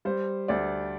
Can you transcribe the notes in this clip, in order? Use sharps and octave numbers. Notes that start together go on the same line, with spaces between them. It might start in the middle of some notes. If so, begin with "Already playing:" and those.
G3 C5
D2 D5